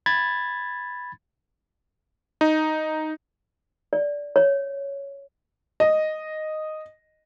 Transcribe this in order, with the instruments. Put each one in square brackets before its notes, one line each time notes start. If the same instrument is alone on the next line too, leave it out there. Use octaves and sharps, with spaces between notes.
[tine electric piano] B5 G#6 A6
[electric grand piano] D#4
[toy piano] D5
C#5
[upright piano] D#5